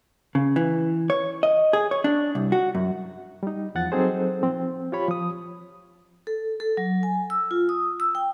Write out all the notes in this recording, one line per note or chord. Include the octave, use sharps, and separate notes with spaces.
C#3
E3
C#5
D#5
G#4
C#5
D4
C2
F#4
F#2
G3 D#4
E2 F3 F#5 A6
F#3 C4 D#4 G#4 A4 C5
F3 C4
F4 G4 C#5 B5
F3 D#6
A4
A4
F#3
G#5
E6
F4
D#6
E6
G5